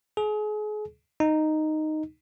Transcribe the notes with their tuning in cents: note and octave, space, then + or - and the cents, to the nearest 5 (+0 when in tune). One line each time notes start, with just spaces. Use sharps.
G#4 +35
D#4 -5